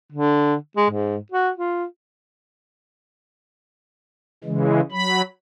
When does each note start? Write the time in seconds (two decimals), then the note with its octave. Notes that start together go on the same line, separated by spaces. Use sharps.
0.12 D3
0.77 G#3
0.90 G#2
1.32 F#4
1.57 F4
4.44 C#3 E3 G#3
4.92 F#3 B5